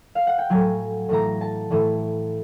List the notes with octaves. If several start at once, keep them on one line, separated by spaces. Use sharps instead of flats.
F5
F#5
G5
A2 F#3 G#5
A2 E3 A#5
A5
A2 E3